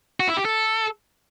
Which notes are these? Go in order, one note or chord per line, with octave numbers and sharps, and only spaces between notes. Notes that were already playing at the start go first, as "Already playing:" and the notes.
F#4
E4
G4
A4